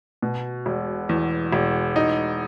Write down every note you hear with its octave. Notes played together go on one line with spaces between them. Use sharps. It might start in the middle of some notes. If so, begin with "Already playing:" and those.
B2
E1
E2
E1
D#4